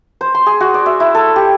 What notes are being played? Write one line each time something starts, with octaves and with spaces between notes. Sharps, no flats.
C5
C6
G#4
F#4
D5
E5
E4
A4
G4